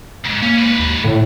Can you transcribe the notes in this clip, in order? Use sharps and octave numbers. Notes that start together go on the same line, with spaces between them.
D2 G#2
A#3 C#4
G#2 B4
D#2
A2 D3